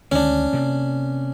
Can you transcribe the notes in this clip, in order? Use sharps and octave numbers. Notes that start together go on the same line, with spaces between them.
D2 D#3 G#3 C#4 D4
C3 A#3